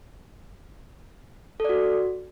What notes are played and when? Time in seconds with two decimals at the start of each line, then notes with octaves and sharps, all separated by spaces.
1.60 A4
1.64 D5
1.69 F#4